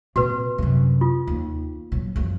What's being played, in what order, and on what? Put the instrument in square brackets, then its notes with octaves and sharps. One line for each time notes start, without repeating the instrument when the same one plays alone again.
[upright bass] A#2 C4 [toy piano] F#4 B4
[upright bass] F#2 C3
[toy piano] F4
[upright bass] D#2
A#2 F#3
F#2 F3